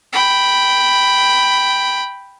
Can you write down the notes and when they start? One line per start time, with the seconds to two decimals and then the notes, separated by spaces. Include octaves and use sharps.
0.13 G5 B5